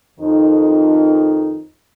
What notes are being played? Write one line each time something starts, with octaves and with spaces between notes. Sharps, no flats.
F2 D#3 D#4